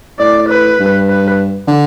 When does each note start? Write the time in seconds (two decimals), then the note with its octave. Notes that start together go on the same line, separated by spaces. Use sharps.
0.19 A2 D5
0.49 B4
0.79 G2
1.09 B4
1.68 D3